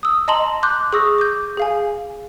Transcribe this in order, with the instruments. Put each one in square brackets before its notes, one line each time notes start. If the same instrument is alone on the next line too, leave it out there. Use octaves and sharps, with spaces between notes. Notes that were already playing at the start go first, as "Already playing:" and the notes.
[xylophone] D#6 E6
D#5 A5 A#5 C6 F#7
C6 D6 F#6 G6
G#4 C#6 D#6 E6 A#6
D6 G6
G#4 F5 G#5